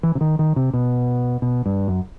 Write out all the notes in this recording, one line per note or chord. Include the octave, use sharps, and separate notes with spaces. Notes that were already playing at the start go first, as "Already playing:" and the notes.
E3
C3
D#3
D#3
C3
B2
B2
G2
F#2